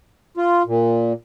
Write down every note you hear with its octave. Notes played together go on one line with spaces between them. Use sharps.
F4
A#2